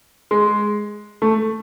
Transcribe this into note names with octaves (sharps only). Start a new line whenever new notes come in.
G#3
A3